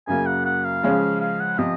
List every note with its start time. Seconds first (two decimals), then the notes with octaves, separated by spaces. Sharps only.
0.07 F#2 C#3 F#3 A#3 G#5
0.26 F#5
0.45 F#5
0.64 F5
0.83 C#3 F3 G#3 C#4
1.21 F5
1.40 F#5
1.59 C3 F3 D#5